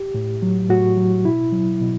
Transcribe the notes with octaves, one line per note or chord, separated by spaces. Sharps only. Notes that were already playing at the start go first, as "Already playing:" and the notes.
Already playing: G4
A2
F#3
A2 F#4
F#3
B2 E4
F#3
B2